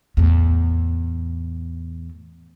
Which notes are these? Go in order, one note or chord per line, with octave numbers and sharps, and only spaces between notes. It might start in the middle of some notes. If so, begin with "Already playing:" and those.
E2 A2